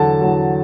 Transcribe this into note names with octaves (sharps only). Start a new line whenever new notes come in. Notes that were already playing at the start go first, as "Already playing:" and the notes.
Already playing: E2 D3 F#3 A5
E2 D3 F#3